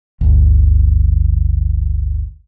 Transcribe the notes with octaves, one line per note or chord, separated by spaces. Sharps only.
G1 D2